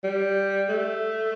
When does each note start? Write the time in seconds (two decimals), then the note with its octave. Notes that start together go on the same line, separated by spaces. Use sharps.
0.04 G3
0.69 A3